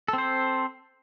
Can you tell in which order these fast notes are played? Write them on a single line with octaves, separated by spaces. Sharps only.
A4 C4 C5